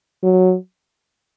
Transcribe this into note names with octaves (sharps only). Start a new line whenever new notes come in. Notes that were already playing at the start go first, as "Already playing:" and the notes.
F#3